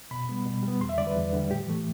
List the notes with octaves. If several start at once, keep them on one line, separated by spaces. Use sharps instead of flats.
B2 B5
G3 B3
B2
G3 B3
E2 C6
E5
D3 G3 D5
B4
E2
D3 G3
A2 G4
E3 A3